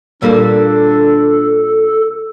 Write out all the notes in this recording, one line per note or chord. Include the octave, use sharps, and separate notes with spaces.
A#2 G3 A#3 D4 A4